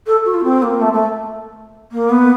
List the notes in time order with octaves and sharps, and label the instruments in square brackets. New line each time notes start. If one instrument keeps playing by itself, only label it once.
[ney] A4
F#4
F4
C4
A#3
A3
A3
A#3
B3